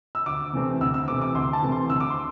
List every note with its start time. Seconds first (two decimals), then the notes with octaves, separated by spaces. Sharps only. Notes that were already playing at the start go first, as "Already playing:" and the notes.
0.15 E6
0.26 D2 D6
0.53 C3 E3 A3 C4
0.81 D2 E6
0.94 E6
1.08 C3 E3 A3 C4 D6
1.22 D6
1.35 D2 C6
1.53 A5
1.62 C3 E3 A3 C4
1.72 C6
1.90 D2 E6
2.00 D6
2.10 C6